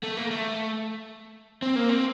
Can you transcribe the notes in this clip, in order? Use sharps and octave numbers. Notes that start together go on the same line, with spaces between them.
A3
A#3
A3
C4
A#3
C4